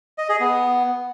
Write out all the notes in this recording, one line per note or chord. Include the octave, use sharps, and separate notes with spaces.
D#5
G#4
B3